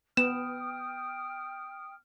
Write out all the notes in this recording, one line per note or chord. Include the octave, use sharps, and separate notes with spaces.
B3 G5 D#6 F6 E7